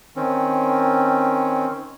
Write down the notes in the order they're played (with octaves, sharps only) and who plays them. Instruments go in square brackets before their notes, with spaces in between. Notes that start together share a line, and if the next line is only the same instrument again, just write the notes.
[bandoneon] D#3 C4 C#4